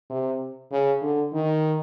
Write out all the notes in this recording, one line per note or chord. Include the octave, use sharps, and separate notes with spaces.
C3
C#3
D3
D#3